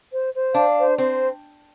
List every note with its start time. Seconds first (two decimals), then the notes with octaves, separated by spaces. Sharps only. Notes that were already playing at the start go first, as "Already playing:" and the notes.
0.12 C5
0.34 C5
0.54 D4 F5
0.77 C5
0.98 C4 C5